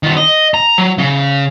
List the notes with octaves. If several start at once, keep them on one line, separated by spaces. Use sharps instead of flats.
D#3 F#4
D#5
A#5
F#3
C#3